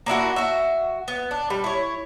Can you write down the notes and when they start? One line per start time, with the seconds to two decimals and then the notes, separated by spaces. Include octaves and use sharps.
0.06 A#3 D4 E4 F#4
0.36 F#4 E5
1.08 B3
1.31 D4
1.50 G3
1.64 E4 C#5